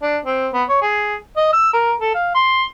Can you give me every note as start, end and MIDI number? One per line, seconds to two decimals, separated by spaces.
0.03 0.18 62
0.25 0.48 60
0.54 0.64 59
0.69 0.78 73
0.82 1.16 68
1.37 1.48 75
1.53 1.73 88
1.73 1.92 70
2.00 2.14 69
2.14 2.32 77
2.35 2.64 84